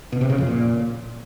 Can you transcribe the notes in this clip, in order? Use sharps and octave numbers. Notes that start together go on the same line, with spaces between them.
B2
C3
C#3
F2
A#2